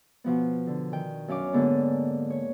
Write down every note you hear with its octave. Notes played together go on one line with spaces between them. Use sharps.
B2 F3 B3
D3
D#3 G5
F#2 C#4 F5 D6
G#2 D3 A#3 B3
C#5